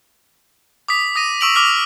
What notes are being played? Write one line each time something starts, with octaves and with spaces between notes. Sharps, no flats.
D6 D#6 B6
D#6 A#6 D#7
C#6 D#6 E6 D7 F7 F#7
D6 F6 B6